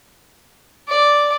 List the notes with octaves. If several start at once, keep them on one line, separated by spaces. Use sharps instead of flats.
D5